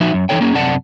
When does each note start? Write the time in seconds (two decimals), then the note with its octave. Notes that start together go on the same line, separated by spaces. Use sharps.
0.01 F3 D#4 F#4 E5
0.13 F#2
0.29 E3 F#3 D#4 A4 C#5 G5
0.41 A#3 C#4 G#4
0.55 F#2 C3 D5 F#5 A5